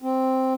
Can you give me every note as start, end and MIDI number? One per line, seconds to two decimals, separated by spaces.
0.02 0.54 60